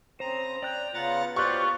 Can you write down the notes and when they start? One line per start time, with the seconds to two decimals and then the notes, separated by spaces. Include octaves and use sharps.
0.20 C#3 C4 C5 A#5 D#6
0.63 D5 G5 F#6
0.94 C#3 B3 F4 F#5 A#5 A6
1.36 F4 G4 C5 D5 C#6 F#6